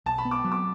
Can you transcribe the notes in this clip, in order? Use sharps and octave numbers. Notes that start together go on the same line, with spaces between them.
B1 A5
B5
B3
D6
F#3
D6